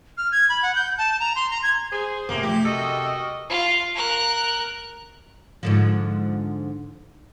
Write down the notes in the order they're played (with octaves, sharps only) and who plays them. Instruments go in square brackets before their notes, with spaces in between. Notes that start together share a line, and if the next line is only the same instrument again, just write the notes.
[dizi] F6
G#6
B5
F#5
G6
A5
A#5
C6
A#5
G#6
[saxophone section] G#4 [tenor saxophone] C5
[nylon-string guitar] A2 C3 [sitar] A#3
[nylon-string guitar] C3 F3 A3 [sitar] G4
[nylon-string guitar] C3 [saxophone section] F#4 A#4 D#5 [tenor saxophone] A4
[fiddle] F4
A#4 F#6
[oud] G#2 D3 F3